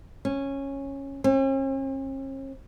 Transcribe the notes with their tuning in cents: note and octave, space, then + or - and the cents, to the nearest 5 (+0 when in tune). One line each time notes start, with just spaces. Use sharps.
C#4 -10
C#4 -45